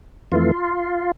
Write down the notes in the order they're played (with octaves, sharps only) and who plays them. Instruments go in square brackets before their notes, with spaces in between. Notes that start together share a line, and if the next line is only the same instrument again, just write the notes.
[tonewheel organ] F2 E3 A3 F4